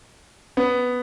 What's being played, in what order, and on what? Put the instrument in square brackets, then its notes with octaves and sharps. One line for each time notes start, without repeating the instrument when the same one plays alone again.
[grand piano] B3